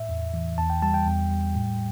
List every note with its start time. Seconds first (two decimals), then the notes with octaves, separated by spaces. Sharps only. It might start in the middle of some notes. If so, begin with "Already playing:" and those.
Already playing: A2 E5
0.09 E2
0.34 E3
0.58 E2 A5
0.70 G5
0.82 G3 A5
0.94 G5
1.07 E2
1.31 G3
1.55 A2